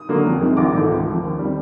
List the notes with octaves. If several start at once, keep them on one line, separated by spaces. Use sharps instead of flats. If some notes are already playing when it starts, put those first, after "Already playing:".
Already playing: D#6
D3 F#3 A#3
F2
C3 D#3 G#3
A#1 D6
G#2 E3 A3
C#2
C#3
F3
D#2
D#3 G3 C4